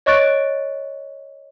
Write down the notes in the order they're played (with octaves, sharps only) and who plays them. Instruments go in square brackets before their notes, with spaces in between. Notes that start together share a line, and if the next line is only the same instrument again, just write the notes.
[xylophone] C#5 D#5 C#6 F#6 A6 D7